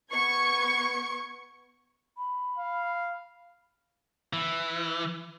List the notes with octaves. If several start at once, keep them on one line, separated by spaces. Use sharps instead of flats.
B3 C#6 G#6 C#7
B5
F5
E3